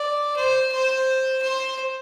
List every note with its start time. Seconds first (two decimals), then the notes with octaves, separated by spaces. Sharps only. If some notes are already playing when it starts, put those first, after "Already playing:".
Already playing: D5
0.36 C5
0.72 C5
1.42 C5